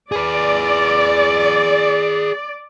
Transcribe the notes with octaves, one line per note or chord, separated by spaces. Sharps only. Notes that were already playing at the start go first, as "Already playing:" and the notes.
G#4 B4 D5